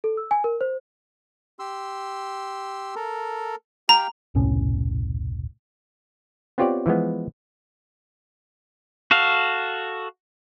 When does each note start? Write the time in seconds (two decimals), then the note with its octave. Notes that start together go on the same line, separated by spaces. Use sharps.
0.04 A4
0.17 E6
0.31 G#5
0.44 A#4
0.61 C5
1.59 G4 C6 E6
2.96 A4 A#4
3.89 G4 F5 G5 A#5
4.35 E1 C2 A2 C#4
6.58 B3 C4 F4 G4 C#5 D5
6.86 E3 F3 G#3 B3
9.11 F#4 A4 F5